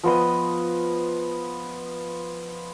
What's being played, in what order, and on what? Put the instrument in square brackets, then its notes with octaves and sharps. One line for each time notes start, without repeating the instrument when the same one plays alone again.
[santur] F3 B3 D#5